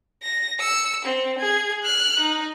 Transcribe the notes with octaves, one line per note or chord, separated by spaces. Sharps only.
A#6
E6 C#7
C4
G#4 G#6
F6 F#6
D#4